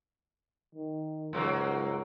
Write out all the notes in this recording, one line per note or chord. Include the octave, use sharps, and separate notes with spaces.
D#3
C#2 G2 F#3 A#3